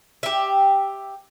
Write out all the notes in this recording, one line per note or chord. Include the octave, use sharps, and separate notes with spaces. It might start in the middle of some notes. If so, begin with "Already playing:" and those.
G4 E5